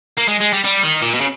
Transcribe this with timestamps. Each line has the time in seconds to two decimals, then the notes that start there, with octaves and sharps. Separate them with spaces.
0.18 A#3
0.28 G#3
0.41 G#3
0.53 G3
0.65 G3
0.83 D#3
1.02 A#2
1.15 B2
1.21 C#3